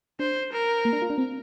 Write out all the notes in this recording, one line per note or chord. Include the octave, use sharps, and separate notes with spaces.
D4 C5
A#4
A#3
D4
F4
D4
C4